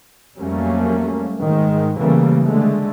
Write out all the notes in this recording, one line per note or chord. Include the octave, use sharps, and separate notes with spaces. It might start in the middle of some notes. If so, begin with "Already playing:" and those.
F2 F#3 G3 A3 A#3 C#4
G#2 D#3 G#3
C#3 E3 G3 A3 A#3
D3 G#3 A3